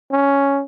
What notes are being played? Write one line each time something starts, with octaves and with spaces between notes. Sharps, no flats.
C#4